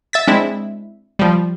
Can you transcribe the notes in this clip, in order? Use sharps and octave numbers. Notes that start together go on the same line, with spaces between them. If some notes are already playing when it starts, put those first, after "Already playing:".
E5 A6 B6
G#3 C4 D4 E4 E5
F3 G3